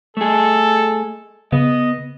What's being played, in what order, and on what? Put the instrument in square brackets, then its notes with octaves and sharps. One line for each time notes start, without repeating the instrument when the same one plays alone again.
[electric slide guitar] A3 G#4 [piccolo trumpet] A4
[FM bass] C#3 [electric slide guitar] B3 [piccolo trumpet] D#5